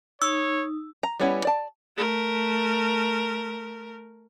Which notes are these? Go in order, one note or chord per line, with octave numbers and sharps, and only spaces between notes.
D#4 C#5 E6
A#5
G3 B3 C#4 E4 F#5
D5 A5
A3 A#4